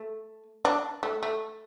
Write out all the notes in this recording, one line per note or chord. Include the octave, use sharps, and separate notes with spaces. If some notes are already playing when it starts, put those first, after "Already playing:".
Already playing: A3
D4
A3
A3